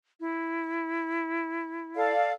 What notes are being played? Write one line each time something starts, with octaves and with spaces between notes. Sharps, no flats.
E4
A4 D5 F5